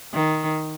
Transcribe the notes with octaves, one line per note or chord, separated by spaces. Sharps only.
D#3